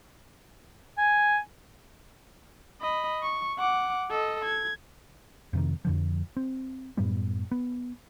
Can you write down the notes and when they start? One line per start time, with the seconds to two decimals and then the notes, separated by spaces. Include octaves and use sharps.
0.98 G#5
2.82 D#5 B5
3.23 C#6
3.59 F#5 D6
4.10 A4 D#5
4.45 G#6
5.53 F2 C3 D#3
5.85 F2 D3 F3
6.36 C4
6.97 F#2 A2 G3 B3
7.51 B3